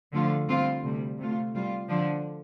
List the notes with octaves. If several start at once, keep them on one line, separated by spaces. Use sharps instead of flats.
D3 F3 A3 F4
D3 G3 C4 F4
D2 C3 G3
C3 A3 F4
C3 G3 F4
D3 F3 D4